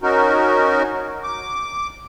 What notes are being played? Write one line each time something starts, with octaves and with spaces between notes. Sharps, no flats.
C#4 D#4 F#4 A#4
D6